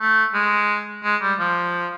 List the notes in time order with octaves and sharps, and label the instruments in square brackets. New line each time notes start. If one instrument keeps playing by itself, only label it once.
[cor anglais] A3
G#3
G#3
G3
F3